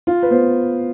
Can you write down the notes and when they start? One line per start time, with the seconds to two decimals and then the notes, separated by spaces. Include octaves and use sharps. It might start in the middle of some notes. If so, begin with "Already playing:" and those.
0.07 F4
0.23 B4
0.30 B3 C5